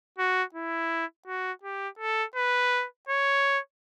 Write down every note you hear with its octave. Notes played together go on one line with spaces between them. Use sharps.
F#4
E4
F#4
G4
A4
B4
C#5